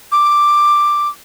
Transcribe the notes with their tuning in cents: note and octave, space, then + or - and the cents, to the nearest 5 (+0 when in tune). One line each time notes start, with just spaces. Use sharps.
D6 +5